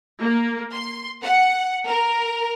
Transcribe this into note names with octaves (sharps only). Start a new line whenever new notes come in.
A#3
C6
F#5
A#4